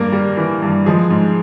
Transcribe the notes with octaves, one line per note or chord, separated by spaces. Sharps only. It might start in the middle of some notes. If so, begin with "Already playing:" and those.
Already playing: G2 A#3 A#4
G3
E3
G2
F3 G#3 G#4
G#2